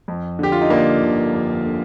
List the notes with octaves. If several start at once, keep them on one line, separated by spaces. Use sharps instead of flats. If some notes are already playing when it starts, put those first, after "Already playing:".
F2
D3 G4
F4
D#4
G1 A#3 D4
G1
F2
D3